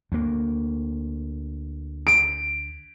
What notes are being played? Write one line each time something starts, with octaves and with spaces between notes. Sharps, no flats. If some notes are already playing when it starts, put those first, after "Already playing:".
D2 A#3
D7